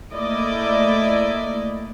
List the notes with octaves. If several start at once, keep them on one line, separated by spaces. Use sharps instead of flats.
A3 A#3 E4 D5 D#5